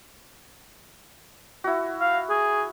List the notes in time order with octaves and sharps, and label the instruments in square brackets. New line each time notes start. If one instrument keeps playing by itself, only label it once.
[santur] E4 F#4
[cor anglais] F5
G#4